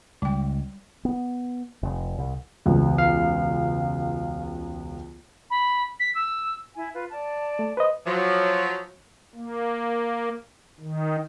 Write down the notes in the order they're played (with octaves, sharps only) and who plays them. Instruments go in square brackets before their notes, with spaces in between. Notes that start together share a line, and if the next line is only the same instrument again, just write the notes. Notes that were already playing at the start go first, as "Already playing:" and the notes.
[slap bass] C#2 [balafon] G3 G5
[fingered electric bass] B3
F1
C2
[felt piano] E1 C#2
[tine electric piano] F5
[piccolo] B5
B6
E6
[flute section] E4 G#5
F4 B4
D5 A5
[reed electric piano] A3
B4 C5 D#5
[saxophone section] F3 F#3
[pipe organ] A#3
D#3